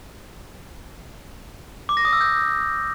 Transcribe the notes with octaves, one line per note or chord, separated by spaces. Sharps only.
D6
A#6
D#6
E6
G6